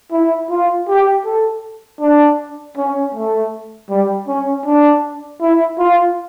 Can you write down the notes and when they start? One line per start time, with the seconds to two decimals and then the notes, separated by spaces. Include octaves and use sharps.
0.12 E4
0.50 F4
0.88 G4
1.25 A4
2.01 D4
2.77 C#4
3.15 A3
3.90 G3
4.28 C#4
4.66 D4
5.41 E4
5.79 F4